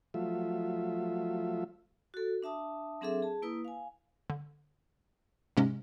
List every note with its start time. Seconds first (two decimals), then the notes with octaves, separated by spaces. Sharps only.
0.14 F3 F#3 A3 F4 E5
2.14 F#4 A4
2.43 D4 E5 A5 D#6
3.01 F#3 C4 D4 G#4 A4 E5
3.22 G#4 A5
3.42 A#3 E4 B4 D#6
3.65 F5 G#5
4.30 D3
5.57 G#2 C3 G#3 C#4